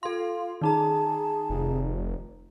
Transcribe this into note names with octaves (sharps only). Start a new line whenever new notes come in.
F4 A4 F5 C6
D#3 D#4 G#4 A5 A#5
F1